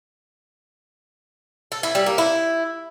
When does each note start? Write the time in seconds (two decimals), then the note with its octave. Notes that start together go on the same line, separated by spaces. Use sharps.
1.72 A4
1.83 E4
1.95 G3
2.06 A#3
2.18 E4